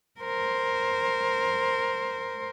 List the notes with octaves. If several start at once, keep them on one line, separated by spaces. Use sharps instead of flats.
A#4 C5